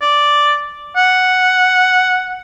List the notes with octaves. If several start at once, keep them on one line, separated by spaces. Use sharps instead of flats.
D5
F#5